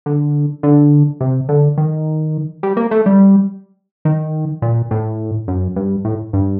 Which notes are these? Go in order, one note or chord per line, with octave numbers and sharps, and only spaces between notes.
D3
D3
C3
D3
D#3
G3
A#3
A3
G3
D#3
A#2
A2
F#2
G2
A2
G2